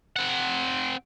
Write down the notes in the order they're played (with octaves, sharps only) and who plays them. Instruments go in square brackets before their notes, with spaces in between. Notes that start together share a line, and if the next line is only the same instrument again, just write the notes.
[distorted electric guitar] C4 F#5